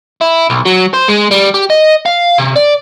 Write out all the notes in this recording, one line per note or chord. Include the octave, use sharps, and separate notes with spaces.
E4
B1
F#3
C5
G#3
G3
G4
D#5
F5
C3
D5